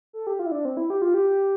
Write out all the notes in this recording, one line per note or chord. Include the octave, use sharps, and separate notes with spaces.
A4
G4
F4
E4
D4
C4
E4
G4
F4
G4